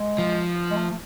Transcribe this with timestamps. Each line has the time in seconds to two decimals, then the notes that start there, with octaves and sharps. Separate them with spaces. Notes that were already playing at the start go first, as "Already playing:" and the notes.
Already playing: G#3
0.18 F3
0.71 G#3
0.77 A3
0.90 A3